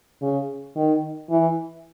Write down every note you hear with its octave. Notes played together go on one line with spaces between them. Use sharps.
C#3
D#3
E3